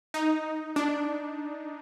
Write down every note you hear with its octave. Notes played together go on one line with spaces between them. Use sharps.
D#4
D4